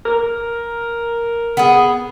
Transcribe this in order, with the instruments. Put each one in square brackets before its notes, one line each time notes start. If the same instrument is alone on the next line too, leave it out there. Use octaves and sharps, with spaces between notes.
[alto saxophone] A#4
[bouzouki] B3 G#4